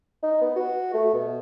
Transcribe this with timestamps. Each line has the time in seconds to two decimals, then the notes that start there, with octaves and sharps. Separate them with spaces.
0.23 D#4
0.41 B3
0.56 F#4
0.94 A3
1.14 B2